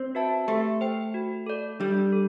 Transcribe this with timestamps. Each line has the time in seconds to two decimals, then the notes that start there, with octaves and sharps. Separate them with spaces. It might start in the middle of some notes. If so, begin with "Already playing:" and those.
Already playing: C4
0.15 F#4 B4 E5 A5
0.48 A3 G4
0.81 C5 G5
1.14 F#4
1.46 A4 D5
1.80 G3 D4
2.12 A4